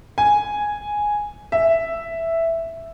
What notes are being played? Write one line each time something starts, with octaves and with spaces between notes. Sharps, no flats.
G#5
E5